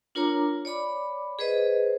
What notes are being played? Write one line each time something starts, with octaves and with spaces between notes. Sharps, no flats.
D4 F4 A#4 C#5 A#5 D6
C#5 D5 B5 D6
G#4 B4 C5 D#5